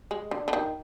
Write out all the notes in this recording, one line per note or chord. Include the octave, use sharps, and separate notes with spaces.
G#3
D3
D3
D#3